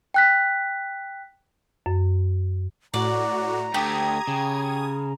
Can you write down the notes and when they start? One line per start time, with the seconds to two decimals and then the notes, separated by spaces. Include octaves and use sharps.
0.14 G5 F#6 B6
1.86 F#2
2.94 A2 F#4 D5 A#5
3.74 D2 A3 G4 D#6 G#6
4.28 C#3